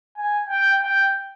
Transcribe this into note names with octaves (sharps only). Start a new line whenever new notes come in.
G#5
G5
G5